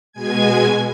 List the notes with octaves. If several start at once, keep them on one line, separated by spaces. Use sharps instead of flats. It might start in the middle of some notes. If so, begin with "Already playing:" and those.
B2 G#3 G#5 G#6